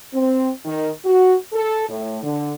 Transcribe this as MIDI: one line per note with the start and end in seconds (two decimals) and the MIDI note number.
0.13 0.49 60
0.65 0.91 51
1.05 1.34 66
1.53 1.87 69
1.89 2.18 45
2.23 2.53 50